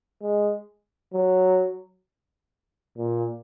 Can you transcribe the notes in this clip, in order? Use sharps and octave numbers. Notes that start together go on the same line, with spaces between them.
G#3
F#3
A#2